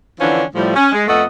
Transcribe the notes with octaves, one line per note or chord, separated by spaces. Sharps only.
D3 E3 F3 C#4 D4
A2 F3 G3
C#4
G#3
F2 A3 B3 A4 D#5 F#5